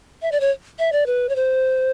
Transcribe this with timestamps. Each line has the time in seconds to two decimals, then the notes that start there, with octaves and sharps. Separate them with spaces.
0.22 E5
0.32 D5
0.40 C#5
0.79 E5
0.92 D5
1.06 B4
1.29 C#5
1.36 C5